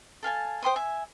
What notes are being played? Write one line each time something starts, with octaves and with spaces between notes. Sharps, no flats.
A4 F5 G#5 A5
C5 G5 C6 D#6
E5 G#5